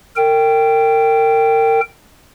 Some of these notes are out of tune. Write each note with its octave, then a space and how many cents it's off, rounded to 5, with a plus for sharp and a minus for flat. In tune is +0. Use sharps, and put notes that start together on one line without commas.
A#4 -35 G5 +0